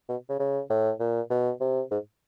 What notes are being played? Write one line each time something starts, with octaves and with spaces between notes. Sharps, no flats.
B2
C#3
C#3
A2
A#2
B2
C3
G#2